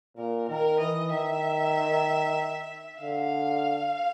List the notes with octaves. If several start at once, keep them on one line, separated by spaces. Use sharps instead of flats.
A#2 A#4
D#3 A#4
E3 D#5
D#3 E5
D3 F5